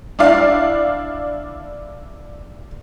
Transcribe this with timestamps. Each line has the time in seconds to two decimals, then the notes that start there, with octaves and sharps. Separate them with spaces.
0.19 D4 E4 D5 F5